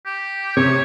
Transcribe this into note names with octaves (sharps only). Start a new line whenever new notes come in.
G4
C3 C#5